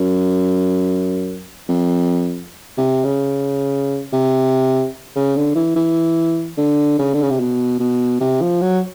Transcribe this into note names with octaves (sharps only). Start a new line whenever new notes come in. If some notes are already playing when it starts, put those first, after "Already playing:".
Already playing: F#2
F2
C3
C#3
C3
C#3
D3
E3
E3
D3
C#3
D3
C#3
C3
B2
B2
C3
F3
F#3